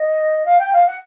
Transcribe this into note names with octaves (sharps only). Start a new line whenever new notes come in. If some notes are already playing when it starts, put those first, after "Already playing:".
Already playing: D#5
F5
G5
F5
F#5